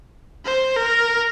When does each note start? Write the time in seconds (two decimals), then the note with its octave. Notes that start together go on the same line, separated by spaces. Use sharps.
0.45 C5
0.76 A#4